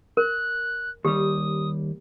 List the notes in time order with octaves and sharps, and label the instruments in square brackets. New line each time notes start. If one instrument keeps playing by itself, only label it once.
[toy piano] A#4 [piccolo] F#6
[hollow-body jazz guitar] D#2 G3 [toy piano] G4 [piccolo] D#6